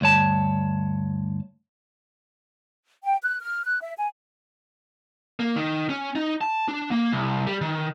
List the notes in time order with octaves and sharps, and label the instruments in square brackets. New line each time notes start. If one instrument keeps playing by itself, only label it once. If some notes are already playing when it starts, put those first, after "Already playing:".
[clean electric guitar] D2 G2 C#5 A5
[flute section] G5
F#6
F6
F#6
E5
G#5
[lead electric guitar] A#3
D#3
C#4
D#4
A5
D4
A#3
C2
G3
D#3